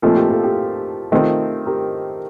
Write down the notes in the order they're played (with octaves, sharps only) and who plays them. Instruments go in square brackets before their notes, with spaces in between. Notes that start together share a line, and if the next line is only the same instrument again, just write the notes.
[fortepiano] A#2 F3 A3 C4 D#4 [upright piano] F4 A4
[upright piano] G4 A#4
F4 A4
G4
[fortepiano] D#3 A3 C4 F4
[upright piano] G4 A#4